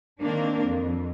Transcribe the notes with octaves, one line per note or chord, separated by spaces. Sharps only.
D#3 A#3 C4 D4
F2